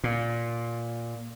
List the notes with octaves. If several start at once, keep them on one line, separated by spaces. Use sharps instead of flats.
A#2